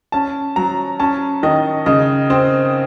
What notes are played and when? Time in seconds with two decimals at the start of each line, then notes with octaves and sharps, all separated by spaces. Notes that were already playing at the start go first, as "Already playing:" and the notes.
0.12 C#4 A5
0.56 F#3 A#5
1.00 C#4 A5
1.43 D#3 D#5
1.86 C#3 D#5
2.30 C4 C5